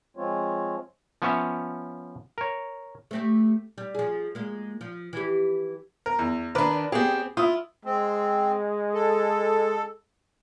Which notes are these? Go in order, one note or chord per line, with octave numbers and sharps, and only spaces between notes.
F3 G#3 C4 F4 C#5
F3 B3 C#4 C#5 E5
A#4 C#5
A3 C4 G4
G3
F3 G#4
G#3 A#3
F3
E3 G4
A#4
E2
D#3 D4 A#4 B4 D6
B3 C4 G4 G#4
E4 F4 D#6
G#3 C4
A4